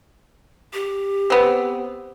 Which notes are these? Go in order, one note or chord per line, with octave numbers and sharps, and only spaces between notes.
G4
B3 C4